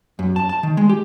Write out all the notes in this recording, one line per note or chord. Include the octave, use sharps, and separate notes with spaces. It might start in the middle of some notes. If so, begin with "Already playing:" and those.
F#2
A5
A5
D#3
G#3
G4